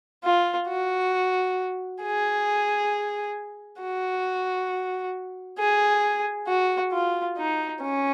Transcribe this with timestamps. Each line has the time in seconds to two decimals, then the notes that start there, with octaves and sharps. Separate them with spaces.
0.25 F4
0.69 F#4
2.02 G#4
3.81 F#4
5.59 G#4
6.48 F#4
6.93 F4
7.38 D#4
7.82 C#4